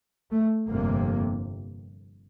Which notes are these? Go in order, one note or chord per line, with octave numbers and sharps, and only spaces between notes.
A3
G1 F2 C3 A#3